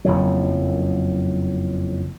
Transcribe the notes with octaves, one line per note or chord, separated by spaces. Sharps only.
F#1 F2 A2 F#3